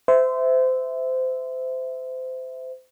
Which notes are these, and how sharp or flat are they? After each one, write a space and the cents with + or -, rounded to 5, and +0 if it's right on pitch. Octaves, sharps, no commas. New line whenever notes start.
C5 -25 E5 -5